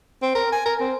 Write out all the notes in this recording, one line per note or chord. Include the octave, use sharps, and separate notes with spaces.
C4
A#4
G#5
A#4
C4